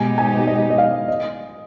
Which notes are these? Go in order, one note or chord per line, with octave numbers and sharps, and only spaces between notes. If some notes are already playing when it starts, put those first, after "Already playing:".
Already playing: B2 G#3 B3 D#4 G4 G#5
G#5
D#5
D#5
F5
D#5